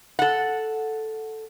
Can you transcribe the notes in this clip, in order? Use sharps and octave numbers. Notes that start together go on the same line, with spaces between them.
A4 F#5